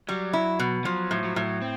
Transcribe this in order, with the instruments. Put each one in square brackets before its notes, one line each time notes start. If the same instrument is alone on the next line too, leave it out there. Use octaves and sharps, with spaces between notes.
[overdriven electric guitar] F#3 [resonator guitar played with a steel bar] G3
[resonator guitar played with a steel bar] E4
B2
[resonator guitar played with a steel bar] F3 [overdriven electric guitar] F#3
[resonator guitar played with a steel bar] A2
[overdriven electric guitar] F#3
[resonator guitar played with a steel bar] A2
[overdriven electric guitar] C4